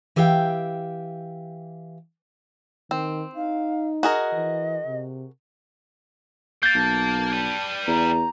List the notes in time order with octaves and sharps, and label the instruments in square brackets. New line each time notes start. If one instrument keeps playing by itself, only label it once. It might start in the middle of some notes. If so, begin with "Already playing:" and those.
[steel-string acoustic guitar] E3 G4 E5 F5 G5
[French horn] D#3 [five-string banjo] C4
[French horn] D#4 [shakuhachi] F5
[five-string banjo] F#4 G#4 A#4 [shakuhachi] D#5
[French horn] E3
C3
[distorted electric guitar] A#3 [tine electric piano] G6 A6
[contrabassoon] B1 [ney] A5
[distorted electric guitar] G3 B4
[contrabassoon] E2 [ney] A#5